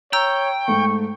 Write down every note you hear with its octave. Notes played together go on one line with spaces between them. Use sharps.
C#5 G5 A#5 E6
G#2 A3 C#6